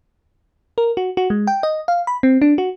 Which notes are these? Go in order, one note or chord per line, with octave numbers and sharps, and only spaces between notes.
A#4
F#4
F#4
G#3
G5
D#5
F5
B5
C4
D4
F#4